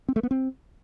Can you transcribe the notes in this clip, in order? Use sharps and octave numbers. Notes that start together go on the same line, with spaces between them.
C4
A3
B3
C4